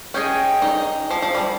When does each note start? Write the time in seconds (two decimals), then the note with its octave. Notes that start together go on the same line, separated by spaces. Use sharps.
0.14 C#4 G#4 D#5 G5
0.62 D#4
1.10 F3
1.22 F3
1.35 G3